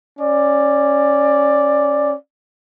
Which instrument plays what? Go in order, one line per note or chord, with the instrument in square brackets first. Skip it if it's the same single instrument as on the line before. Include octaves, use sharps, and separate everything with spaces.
[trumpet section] C#4 D5